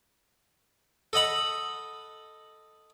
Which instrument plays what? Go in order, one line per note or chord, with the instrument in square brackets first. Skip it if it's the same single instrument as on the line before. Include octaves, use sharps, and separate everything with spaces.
[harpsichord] A4 D#5 F#5 B5